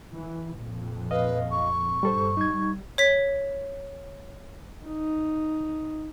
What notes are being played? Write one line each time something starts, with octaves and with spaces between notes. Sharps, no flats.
E3
F2 A#2
B4 D#5 F5
C#6
G2 G3 A4 C5
G3 D#4 G#6
C#5 B6
D#4